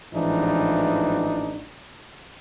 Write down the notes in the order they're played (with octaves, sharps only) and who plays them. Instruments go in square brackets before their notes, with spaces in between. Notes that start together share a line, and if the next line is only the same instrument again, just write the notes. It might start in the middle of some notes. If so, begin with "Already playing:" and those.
[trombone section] A1 G#2 E3 F3 D4 D#4